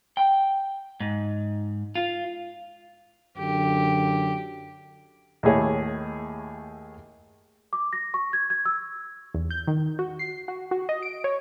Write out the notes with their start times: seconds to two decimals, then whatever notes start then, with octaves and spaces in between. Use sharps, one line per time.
0.17 G5
1.00 G#2
1.95 F4
3.38 F#2 D3 G4
5.43 D#2 A2 E4 G#4 C#5
7.73 D6
7.93 A#6
8.14 C#6
8.33 G#6
8.50 G#6
8.66 E6
9.34 E2
9.50 G6
9.67 D#3
9.99 F#4
10.19 C7
10.48 F#4
10.71 F#4
10.89 D#5
11.02 D7
11.24 C#5